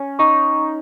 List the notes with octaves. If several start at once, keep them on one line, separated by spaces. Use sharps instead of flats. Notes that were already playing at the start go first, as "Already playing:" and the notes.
Already playing: C#4
D#4 C#6